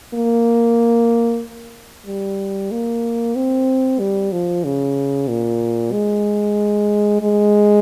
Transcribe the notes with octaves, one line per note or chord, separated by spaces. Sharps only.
A#3
G3
A#3
C4
G3
F3
C#3
A#2
G#3
G#3